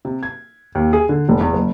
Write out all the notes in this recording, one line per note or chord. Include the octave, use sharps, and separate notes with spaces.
C3
G#6
D#2
G#4
D3
F1
E2
F#1